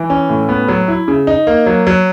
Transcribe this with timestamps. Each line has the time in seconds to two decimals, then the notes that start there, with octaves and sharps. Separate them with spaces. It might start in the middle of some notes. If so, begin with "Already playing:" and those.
Already playing: E3
0.10 C#4
0.30 A2
0.49 B3
0.68 F#3
0.88 E4
1.08 C#3
1.27 D#4
1.47 A#3
1.66 F#3
1.87 F#3